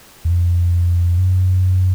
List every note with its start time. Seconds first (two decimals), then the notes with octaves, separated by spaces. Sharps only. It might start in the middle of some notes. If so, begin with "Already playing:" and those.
0.25 E2
0.30 F2
1.18 F#2